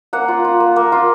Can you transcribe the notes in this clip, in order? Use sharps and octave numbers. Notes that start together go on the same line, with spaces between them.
A#3 F#5
F4
F4
A#3
A#3
F4